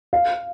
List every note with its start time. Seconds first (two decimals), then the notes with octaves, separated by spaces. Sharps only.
0.13 F5